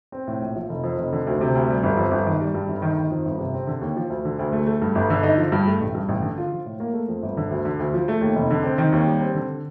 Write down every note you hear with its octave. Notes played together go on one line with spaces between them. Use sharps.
C4
A2
A#1
F3
F1
F2
F1
D3
D2
C3
D2
G3
G1
F2
G1
D#3
G3
G2
G1
D#3
D#3
F2
G1
C3
C4
D3
D#2
F3
D2
D3
D2
A3
A3
G2
G1
D3
D#4
F3
G2
A3
A1
G2
A1
D3
F4
F3
A2
A#3
A3
F2
G1
D3
D2
D3
D2
F3
A3
D#2
F1
D3
C4
D#3
D#2
G3
C4
D3